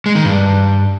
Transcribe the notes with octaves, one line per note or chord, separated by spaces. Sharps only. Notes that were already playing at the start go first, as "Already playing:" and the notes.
G#3
D#3
G2